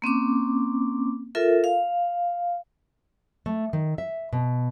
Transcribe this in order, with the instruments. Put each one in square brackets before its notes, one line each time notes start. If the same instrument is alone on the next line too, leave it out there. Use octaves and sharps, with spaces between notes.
[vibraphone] A#3 C4 C#4 D6
F4 A4 A#4 E5
F5
[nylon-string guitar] A3
D#3
E5
B2